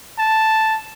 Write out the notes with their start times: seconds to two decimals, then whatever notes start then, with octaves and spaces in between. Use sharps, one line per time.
0.18 A5